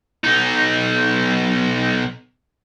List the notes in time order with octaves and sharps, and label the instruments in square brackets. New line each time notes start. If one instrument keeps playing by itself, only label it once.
[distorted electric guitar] B1 D#4